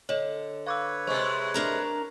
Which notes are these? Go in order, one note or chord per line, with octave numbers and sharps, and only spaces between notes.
D3 C#5 D#5
B4 C#5 F5 D6 E6
C3 G#3 C5 C#6
D4 A#4 A#5